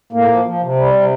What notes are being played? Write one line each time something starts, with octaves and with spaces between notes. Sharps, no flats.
A2 A#3
F3
F3
C3
G3
C3